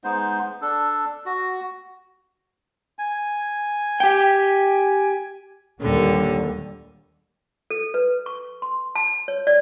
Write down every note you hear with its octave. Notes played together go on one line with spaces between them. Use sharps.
G#3 B3 D#4 C5
D4 A4
F#4
G#5
G4 G5
D#2 A#2 D3 G3
A4
B4
C#6
C6
A5
C#5
D5